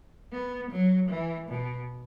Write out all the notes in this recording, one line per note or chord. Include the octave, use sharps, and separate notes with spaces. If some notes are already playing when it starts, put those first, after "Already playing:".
B3
F#3
E3
B2